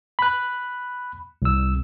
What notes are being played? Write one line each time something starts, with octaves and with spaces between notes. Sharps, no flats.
B5 F#6
C2 E6